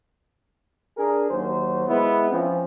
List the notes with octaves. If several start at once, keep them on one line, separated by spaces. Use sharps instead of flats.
D4 G#4 A#4
D#2 F#3 C5
G#3 B3 E4
F3 C4 C#4